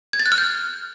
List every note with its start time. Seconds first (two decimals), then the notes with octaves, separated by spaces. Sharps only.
0.13 G#6
0.19 A6
0.26 F#6
0.32 F6
0.38 G6